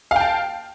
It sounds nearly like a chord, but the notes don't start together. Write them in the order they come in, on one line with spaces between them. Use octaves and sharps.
F5 G5 A5